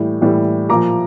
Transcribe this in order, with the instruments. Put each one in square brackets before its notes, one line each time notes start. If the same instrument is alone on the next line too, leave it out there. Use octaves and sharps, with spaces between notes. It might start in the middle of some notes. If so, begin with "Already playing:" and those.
Already playing: [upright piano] A2 E3 G3
A2 E3 G3
A#2 F3 A#5 D6